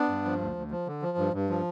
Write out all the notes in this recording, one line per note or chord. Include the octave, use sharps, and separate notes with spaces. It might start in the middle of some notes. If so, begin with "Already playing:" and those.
Already playing: B3 D4
G2
F3
D2
D2
F3
D3
F3
G2
G2
F3